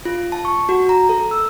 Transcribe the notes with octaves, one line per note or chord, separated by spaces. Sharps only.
F4
A5
C#6
F#4
A#5
A4
E6